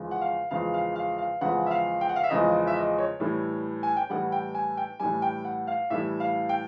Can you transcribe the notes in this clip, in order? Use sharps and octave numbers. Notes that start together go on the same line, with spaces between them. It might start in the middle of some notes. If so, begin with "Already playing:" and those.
Already playing: E2 C#3 F3 G#3
F#5
F5
E2 C#3 F3 G#3 F5
F5
F5
F5
E2 C#3 F3 G#3 F#5
E5
F5
G5
F#5
F5
E5
E2 C#3 F3 G#3 D#5
E5
D#5
C#5
A2 E3 G3
G#5
G5
A2 E3 G3 F#5
G5
G#5
G5
A2 E3 G3 G#5
G5
F#5
F5
A2 E3 G3 E5
F5
G5